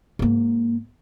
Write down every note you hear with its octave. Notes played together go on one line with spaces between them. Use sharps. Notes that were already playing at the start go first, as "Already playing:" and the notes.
G#2 A#3